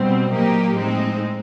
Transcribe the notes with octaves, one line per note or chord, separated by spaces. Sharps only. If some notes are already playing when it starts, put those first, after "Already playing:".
Already playing: B2 G3 C4
A#2 F#3 A#3 D#4 G4
A2 F3 G#3 C4 D#4